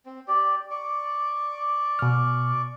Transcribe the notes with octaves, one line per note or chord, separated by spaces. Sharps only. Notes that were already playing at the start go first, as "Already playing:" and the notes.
C4
G4 D5
D5 C#6 D6
B2 F6